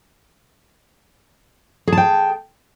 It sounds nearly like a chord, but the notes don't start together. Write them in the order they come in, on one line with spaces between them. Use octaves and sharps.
G#4 A5 G5